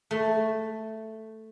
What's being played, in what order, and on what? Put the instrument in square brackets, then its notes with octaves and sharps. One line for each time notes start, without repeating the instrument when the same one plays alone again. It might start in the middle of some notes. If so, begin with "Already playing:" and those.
[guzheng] A3